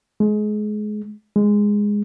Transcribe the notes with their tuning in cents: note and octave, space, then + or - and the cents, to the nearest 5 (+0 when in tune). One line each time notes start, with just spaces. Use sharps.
G#3 +25
G#3 -10